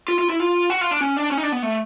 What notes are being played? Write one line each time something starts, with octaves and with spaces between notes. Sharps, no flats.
F4
F4
E4
F4
F#4
F4
D4
C#4
D4
C#4
D#4
D4
B3
A3